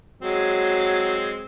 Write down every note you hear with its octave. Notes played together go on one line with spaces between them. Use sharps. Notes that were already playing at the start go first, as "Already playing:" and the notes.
F#3 G#3 C4